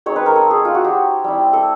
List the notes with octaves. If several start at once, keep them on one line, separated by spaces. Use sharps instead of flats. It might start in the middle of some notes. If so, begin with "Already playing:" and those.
G#3 C4 D#4 C#5
B4
A#4
A4
G#4
F4
F#4
G4
G3 C4 E4
A4